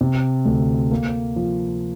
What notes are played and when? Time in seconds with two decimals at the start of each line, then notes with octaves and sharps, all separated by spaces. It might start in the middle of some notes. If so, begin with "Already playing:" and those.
0.01 C3
0.45 D2
0.92 A#3
1.36 F3